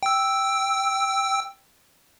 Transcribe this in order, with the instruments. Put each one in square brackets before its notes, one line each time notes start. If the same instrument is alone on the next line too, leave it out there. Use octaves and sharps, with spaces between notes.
[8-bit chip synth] G5 E6